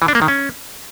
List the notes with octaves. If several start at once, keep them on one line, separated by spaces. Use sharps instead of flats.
E3
D4
A#3
D#3
C#4